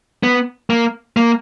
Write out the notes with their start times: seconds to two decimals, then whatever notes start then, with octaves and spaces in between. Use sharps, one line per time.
0.23 B3
0.70 A#3
1.17 A#3